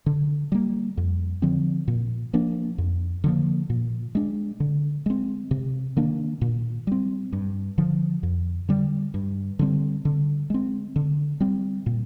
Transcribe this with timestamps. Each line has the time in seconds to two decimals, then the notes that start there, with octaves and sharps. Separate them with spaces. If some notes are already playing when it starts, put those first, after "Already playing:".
0.06 D3
0.52 G3 A#3
0.97 F2
1.42 D3 F3 C4
1.88 A#2
2.33 F3 A#3 D4
2.78 F2
3.24 D3 F3 A#3
3.70 A#2
4.15 G#3 D4
4.60 D3
5.06 G#3 C4
5.51 C3
5.97 D#3 A#3 D4
6.41 A#2
6.87 G3 C4
7.33 G2
7.78 D3 F3
8.23 F2
8.69 D3 G3
9.14 G2
9.59 D3 G3 C4
10.05 D3
10.50 G#3 C4
10.96 D3
11.40 G3 C4
11.86 A#2